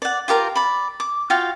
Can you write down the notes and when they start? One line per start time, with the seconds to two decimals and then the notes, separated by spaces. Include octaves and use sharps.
0.02 D5 F#5
0.28 F4 G4 A#4 A#5
0.56 D5 B5
1.00 D6
1.30 F4 F#4 F5 G5